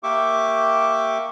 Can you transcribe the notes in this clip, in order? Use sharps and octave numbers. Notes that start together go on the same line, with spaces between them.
A#3 G4 E5 C#6 D6